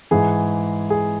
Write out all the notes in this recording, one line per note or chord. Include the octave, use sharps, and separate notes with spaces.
G#2 E3 G#4
G#4